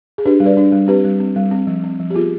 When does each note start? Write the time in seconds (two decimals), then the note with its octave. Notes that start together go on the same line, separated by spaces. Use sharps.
0.18 G#4
0.25 D4 G4 B4
0.40 G3
0.46 B4 D5
0.57 D4
0.72 G3
0.88 C4 G4 B4
1.04 G3
1.20 C4
1.36 G3
1.51 C4
1.67 F3
1.84 C4
2.00 F3
2.10 G4
2.14 B3 F4 G#4